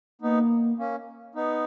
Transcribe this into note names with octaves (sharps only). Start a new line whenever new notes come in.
A#3 B3 D#4
A#3 C#4
B3 D#4